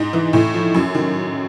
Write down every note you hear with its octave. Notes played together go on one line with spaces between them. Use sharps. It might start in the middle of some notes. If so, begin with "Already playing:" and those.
Already playing: G#2 D#4
E3
A2
F3
F#2
D#3